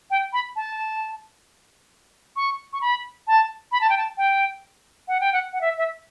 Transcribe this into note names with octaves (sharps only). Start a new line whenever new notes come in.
G5
B5
A5
C#6
C#6
B5
A5
B5
A5
G5
A5
G5
F#5
G5
F#5
F#5
E5
E5